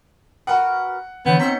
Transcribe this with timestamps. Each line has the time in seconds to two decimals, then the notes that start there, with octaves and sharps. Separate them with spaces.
0.47 F#4 A#4 B4 F#5
1.26 D3 E3 B3 C#5 G6 G#6
1.40 B3 C4 D#4 A#5 G6 B6 C#7